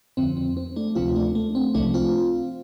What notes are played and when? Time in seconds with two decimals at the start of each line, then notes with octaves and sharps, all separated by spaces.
0.17 F2 D3 F3 C4
0.37 C4
0.57 C4
0.76 A3 D4
0.95 D2 C3 F3 C4 F4
1.16 A3 D4
1.35 A3
1.55 C4
1.74 C2 C3 F3 A3 D4
1.94 C4 F4